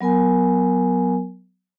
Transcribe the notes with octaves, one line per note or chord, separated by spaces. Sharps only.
F#3 B3 A#4 G#5